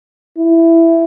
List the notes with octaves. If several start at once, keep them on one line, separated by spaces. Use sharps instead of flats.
E4